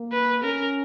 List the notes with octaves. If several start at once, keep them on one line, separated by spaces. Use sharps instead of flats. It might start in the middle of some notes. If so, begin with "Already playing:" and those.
Already playing: A#3
B4
C#4 A#4